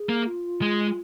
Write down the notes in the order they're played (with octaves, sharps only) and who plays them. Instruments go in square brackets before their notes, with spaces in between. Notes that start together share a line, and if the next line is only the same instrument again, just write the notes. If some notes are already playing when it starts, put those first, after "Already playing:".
Already playing: [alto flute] G#4
[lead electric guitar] A#3
[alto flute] F4
[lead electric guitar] G#3